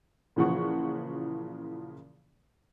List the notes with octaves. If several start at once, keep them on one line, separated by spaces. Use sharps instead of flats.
A#2 C#3 E3 F3 F#5 C#6